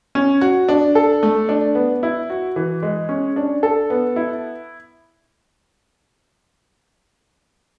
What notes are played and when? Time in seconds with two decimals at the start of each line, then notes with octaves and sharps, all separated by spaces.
0.15 C#4
0.41 F#4
0.69 D4
0.95 A4
1.23 A3
1.49 D4
1.75 B3
2.03 E4
2.30 F#4
2.56 E3
2.83 G#3
3.09 C#4
3.36 D4
3.63 A4
3.90 B3
4.16 E4